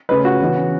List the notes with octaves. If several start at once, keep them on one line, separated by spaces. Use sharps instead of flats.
C#3 A3 B4
F#4
C#3 E3 B3